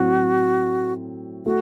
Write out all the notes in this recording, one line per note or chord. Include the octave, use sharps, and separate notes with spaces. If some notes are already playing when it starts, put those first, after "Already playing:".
Already playing: A2 F#3 C4 F#4
A3 F#4